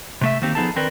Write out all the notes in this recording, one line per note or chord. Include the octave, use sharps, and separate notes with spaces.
C3 A3 E5
D#3 A#3 C4 D#4 G4
F3 B3 D#4 G#4 A4 A5
D3 D#3 C4 A#4 B4 D5